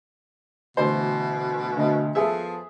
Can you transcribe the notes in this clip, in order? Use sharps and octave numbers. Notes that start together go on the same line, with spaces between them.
D2 B2 E3 C5
D2 D#5
F3 B3 G#4 A4 B4 E5